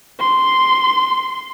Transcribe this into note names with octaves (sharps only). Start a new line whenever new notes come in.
C6